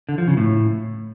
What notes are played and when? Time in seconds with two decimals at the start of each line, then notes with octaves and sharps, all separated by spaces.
0.09 D3
0.18 F3
0.28 C#3
0.37 A2